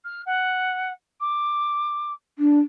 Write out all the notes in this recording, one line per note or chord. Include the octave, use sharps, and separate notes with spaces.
F6
F#5
D6
D4